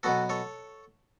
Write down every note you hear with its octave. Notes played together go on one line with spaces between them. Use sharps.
B2 F#3 B3 F#4 A4
A4 C#5